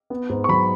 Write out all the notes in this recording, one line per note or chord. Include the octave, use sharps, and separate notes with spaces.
B3
G#2
C#6
F#3 B5